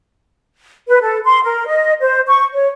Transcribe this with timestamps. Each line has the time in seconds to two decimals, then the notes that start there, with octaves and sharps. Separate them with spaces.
0.88 B4
1.01 A4
1.25 C6
1.44 A#4
1.66 D#5
2.01 C5
2.28 C#6
2.54 C#5